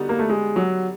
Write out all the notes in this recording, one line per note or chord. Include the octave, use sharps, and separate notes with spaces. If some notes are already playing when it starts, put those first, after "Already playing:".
Already playing: D3 G3 B3 D#4 F#4
A#3
A3
G#3
F#3